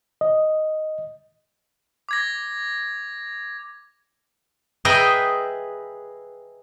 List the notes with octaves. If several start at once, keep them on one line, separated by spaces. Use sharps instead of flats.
D#5
D6 G#6 A#6
G#4 B4 D#5 E5 G5 A#5